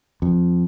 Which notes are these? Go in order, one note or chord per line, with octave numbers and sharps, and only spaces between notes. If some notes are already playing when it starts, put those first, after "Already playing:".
F2